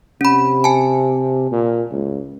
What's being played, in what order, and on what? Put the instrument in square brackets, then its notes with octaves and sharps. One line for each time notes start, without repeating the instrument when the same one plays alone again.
[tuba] C3 [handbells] C#4 B5
[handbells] G#5 A5
[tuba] A#2
C#2